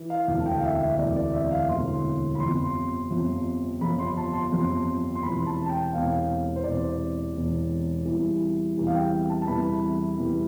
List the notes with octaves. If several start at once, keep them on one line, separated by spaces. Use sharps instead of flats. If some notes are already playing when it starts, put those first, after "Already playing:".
Already playing: E3
F5
E1 D2 C3 E3 F5
A5
G5
F5
E5
E5
E5
E1 D2 C3 E3 D5
D5
E5
F5
E1 D2 C3 E3 C6
B5
G1 F2 C3 F3 C6
G1 F2 C3 F3
G1 F2 C3 F3 B5
C6
A5
C6
G1 F2 C3 F3
C6
E1 E2 C3 B5
A5
A5
G5
E1 E2 C3 F5
C5
E1 E2 C3 D5
E1 E2 C3
E2 C3 E3 G3
E2 C3 E3 G3
F5
G5
A5
A5
E2 C3 E3 G3 B5
E2 C3 E3 G3